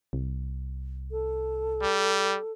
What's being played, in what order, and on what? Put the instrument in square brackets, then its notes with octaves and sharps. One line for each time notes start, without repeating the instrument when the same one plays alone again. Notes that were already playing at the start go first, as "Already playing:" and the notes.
[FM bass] C2
[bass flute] A4
[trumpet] G3